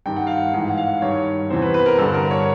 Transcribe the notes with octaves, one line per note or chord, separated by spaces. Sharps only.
G2 D#3 G5
F#5
F5
F#5
G#2 E3 F5
F#5
F5
G2 D#3 C#5
E2 C3 E3 C5
B4
B4
A#4
G2 D3 A4
A#4
C#5